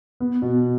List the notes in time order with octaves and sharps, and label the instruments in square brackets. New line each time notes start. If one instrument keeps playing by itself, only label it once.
[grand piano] B3
B2